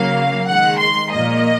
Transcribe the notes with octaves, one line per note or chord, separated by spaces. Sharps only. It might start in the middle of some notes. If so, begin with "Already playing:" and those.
Already playing: C#3 F#3 A#3 F5
D#3 G#3 F#5
C6
A#2 F3 A#3 D#5